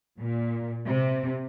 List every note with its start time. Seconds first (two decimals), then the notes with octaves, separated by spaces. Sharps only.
0.20 A#2
0.86 C3